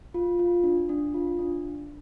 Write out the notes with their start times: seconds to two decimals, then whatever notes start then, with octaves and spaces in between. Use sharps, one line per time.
0.14 F4
0.39 F4
0.64 D4
0.89 D4
1.14 F4
1.39 D4